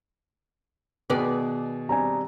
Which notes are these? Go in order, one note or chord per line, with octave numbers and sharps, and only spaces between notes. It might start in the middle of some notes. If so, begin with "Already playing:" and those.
B2 D#3 G#4 B4 D5
G3 C4 D4 G#5 A#5